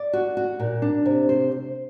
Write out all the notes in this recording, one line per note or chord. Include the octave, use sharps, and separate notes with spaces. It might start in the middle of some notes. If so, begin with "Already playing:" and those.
Already playing: D5
F#4
F#4
A#2
D4
C3
C5
C5